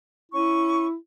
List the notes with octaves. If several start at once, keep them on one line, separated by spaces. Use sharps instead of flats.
C#4 E4 C#6